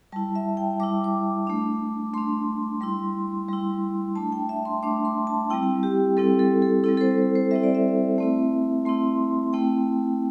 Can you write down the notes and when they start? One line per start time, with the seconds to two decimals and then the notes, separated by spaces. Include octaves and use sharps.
0.12 G3 E4 A5
0.36 E5
0.57 G5
0.80 G3 E4 D6
1.04 D6
1.47 A3 D4
2.14 A3 D4 C6
2.81 G3 E4 C6
3.48 G3 E4
4.15 A3 D4 A5
4.32 G5
4.49 E5
4.65 C6
4.83 A3 D4 D6
5.05 C6
5.27 A5
5.50 G3 C4 E4 G5
5.83 G4
6.17 G3 C4 E4 A4
6.39 A4
6.62 A4
6.84 G3 C4 E4 A4
6.97 A4
7.01 C5
7.35 C5
7.51 G3 C4 E4 E5
7.64 D5
7.75 E5
8.18 A3 C4 E4
8.85 A3 C4 E4 C6
9.53 A3 C4 E4 G5